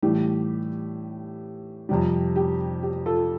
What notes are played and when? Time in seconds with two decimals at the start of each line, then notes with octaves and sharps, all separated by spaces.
0.02 A2 E3 G3 G4
1.89 F2 C3 G3 G4
2.36 G4
2.83 G4
3.06 F4 A4